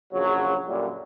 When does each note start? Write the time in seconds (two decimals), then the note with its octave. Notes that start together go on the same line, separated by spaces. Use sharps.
0.13 A#1 C#3 F#3
0.66 F#2 A#2 D3 G3